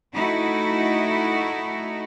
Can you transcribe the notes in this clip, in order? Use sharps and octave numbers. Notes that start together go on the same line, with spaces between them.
A3 D#4 E4 F#4